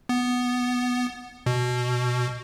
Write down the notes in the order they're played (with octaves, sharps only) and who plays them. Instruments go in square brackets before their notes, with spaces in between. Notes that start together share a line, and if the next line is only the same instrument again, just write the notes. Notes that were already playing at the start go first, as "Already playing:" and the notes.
[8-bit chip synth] B3
B2